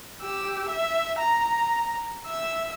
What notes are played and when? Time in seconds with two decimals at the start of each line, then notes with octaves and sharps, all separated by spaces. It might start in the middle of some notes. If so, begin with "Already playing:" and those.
0.21 G4 E6
0.69 E5
1.19 A#5
2.27 E5 E6